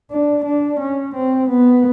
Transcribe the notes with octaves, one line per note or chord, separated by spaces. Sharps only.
D4
D4
C#4
C4
B3